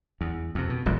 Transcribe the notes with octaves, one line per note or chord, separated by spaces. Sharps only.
E2
F2 C3
B2
D#1 A1 A#2 G3